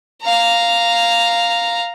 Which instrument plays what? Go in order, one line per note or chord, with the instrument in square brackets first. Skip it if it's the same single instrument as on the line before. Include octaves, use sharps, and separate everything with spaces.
[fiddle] F5 A#5